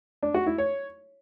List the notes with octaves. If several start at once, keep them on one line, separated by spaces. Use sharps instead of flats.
D4
F#4
E4
C#5